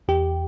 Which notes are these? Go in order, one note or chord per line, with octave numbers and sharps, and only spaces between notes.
E2 G4